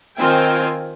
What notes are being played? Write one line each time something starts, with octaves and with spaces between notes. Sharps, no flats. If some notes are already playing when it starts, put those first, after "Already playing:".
D#3 C4 F4 G5 G#5